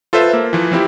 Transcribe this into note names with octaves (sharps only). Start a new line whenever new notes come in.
F4 A4 B4 C5 E5
A#3
E3 F3
F3 C4 E4 G4